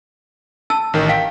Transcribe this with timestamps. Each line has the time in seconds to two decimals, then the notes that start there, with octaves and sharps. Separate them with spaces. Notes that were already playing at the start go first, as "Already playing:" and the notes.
0.70 A5 E6
0.93 A1 D#3
1.09 F5 G5